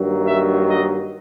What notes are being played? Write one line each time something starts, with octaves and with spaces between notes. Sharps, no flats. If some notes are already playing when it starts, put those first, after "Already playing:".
Already playing: G2 D#3 F#3 A#3
E5
D#5